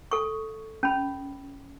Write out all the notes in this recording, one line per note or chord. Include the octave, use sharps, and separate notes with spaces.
A4 C#6
C#4 B5